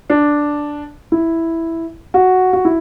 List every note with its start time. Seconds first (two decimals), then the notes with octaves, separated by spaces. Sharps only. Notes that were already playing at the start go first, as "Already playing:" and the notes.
0.10 D4
1.12 E4
2.14 F#4
2.53 F#4
2.65 E4